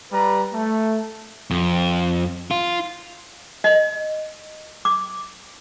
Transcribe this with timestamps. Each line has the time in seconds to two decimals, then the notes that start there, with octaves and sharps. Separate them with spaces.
0.13 G3 B4 A#5
0.54 A3
1.51 F2
2.51 F4
3.64 D#5
4.85 D6